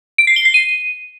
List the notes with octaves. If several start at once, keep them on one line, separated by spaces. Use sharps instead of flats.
D7
C7
G7
C7
D#7